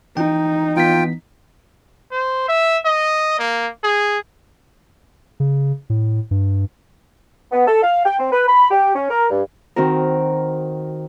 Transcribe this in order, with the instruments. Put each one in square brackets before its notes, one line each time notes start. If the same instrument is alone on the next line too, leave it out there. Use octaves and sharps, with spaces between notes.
[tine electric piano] E3 G5 [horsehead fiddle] D#4
[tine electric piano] E3 B3 B6 [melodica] F4 G5
[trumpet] C5
E5
D#5
A#3
G#4
[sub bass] C#3
A2
G2
[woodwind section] B3
A4
F5
G5
C4
B4
B5
G4
C#4
A#4
G2
[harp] D#3 C4 F#4 A#4